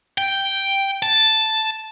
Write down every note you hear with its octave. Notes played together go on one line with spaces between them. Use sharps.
G5
A5